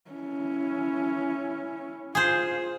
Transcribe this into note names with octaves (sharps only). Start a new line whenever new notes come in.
C#4 E4
F4 G#4 C5